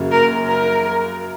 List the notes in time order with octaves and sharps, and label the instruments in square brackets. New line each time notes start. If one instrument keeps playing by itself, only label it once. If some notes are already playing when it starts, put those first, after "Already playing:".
Already playing: [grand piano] F#2 C#3 F#3 A#3
[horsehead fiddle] A#4
A#4